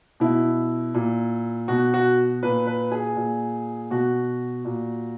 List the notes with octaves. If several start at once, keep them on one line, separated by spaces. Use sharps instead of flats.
B2 E4
A#2
B2 F#4
F#4
A#2 B4
B4
G#4
A#2
B2 F#4
A#2